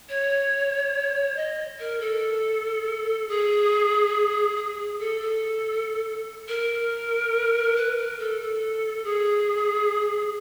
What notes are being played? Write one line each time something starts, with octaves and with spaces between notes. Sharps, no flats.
C#5
D#5
A#4
A4
G#4
G#4
G#4
A4
A4
A#4
B4
A#4
A4
A4
G#4